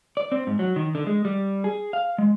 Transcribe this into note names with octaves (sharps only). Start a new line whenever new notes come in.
D5
C4
G#2
F#3
D#3
D3
G#3
G3
G#4
F5
G#3